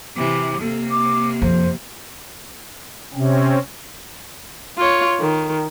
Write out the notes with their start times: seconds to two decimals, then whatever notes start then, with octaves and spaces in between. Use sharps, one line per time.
0.16 C3 E3 D6
0.61 C3 A#3 A4
0.91 D6
1.42 F2 C5
3.13 C3 C4 C#4
4.77 F4 C#5
5.20 D#3